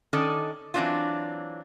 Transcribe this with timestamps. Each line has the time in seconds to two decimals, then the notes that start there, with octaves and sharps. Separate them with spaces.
0.13 D#3 C#4 D4 A4 D5 D#5
0.74 E3 F#3 C4 D4 E4 F4